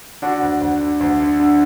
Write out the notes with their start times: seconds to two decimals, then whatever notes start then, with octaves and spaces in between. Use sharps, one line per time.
0.22 D3 D4 F#4
0.42 D2
0.61 D2
0.80 D3
1.00 D2
1.20 D3
1.40 D3